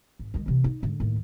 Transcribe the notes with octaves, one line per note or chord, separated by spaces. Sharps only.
G#1
D#3 G#3
C3 E3
D#4
G#2 D3
D#2 A2